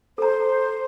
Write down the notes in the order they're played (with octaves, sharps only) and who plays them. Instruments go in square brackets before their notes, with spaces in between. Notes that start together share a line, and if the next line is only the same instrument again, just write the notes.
[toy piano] A4 A#5 [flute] C5